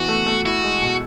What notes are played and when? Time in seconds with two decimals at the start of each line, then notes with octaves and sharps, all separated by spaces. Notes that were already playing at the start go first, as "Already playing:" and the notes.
Already playing: E3 B3 F#4
0.08 A3
0.26 A3
0.45 E4 F#4
0.64 G#3
0.82 B2